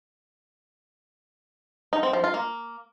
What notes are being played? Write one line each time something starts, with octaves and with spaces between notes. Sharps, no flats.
D#4
C4
F3
F4
A#3